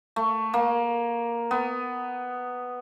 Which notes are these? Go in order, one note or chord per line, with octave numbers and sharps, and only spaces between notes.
A3
A#3
B3